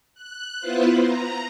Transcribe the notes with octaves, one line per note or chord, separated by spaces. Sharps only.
F#6
B3 E4 F4 B4 C5
A#5